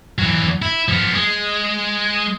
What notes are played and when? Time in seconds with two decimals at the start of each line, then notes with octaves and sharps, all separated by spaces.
0.19 E3 F#3
0.62 E4
0.89 F3 B3
1.15 G#3